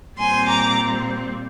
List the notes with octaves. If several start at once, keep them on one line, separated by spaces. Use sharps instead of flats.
A#2 G3 C4 G#5 C6
A#5 D6